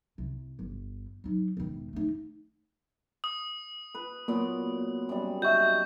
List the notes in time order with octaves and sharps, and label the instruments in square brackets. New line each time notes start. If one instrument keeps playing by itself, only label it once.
[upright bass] C2
G1
F#3 D#4
E1 D#3
A3 D#4
[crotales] D#6
[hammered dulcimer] B4
[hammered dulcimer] A#2 F#3 B3 [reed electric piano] A#3
[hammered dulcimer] F#2 C3 G3
[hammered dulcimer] D#4 [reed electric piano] F#4 E5 [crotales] C#6 G6